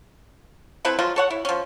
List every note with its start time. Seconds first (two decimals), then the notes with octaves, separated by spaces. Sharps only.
0.85 C4 E4 A4 B4
0.99 F3 F#3 G#3 F4
1.16 A4 C#5 F#5
1.30 E4
1.45 F3 C#4